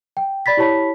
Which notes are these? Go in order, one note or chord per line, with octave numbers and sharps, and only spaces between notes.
G5
D5 B5 A6 B6
E4 G4 C#5 A5 B5 B6